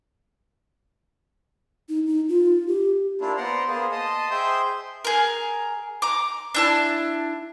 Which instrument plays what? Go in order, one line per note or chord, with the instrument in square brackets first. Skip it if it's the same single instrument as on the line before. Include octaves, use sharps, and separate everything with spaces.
[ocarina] D#4
D#4
F4
G4
[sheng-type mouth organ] A#3 D4 E4 F4
B3 C5 D5 F#5 A#5 C6
A#3 B3 G#4 C5
D#5 A5 C6 D#6
G#4 C5 E5 G5 C6 G6
[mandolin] G#4 A#4
A#5 D6
D4 E4 A5